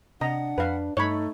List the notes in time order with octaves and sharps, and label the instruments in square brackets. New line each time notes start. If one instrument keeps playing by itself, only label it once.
[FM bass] C3 [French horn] D4 [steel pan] D#5 A#5 [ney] F#5
[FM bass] F2 [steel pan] B4 F5
[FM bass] G2 [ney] A3 [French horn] D#4 [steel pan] C#5 B5